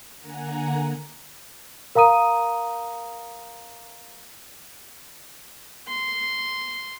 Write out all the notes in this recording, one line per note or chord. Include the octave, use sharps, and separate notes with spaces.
D3 A#3 F#5 G#5 A#5
A#4 F5 A#5 D#6 D#7
C6